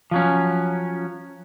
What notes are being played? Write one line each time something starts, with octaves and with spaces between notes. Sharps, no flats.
F3 F#3 C#4